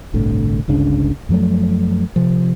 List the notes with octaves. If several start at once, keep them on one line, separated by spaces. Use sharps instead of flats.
G1 C2 A2 D3
G1 C#2 C#3 D4
F#2 F3 F#3 A3
C3 F3